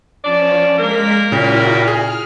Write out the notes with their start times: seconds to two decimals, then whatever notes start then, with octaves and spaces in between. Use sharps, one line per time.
0.24 F3 C#4 D4 D5
0.78 G#3 A#3 A#4 B6
1.32 A#2 C#3 E4 F#4 G5
1.87 G#4 F6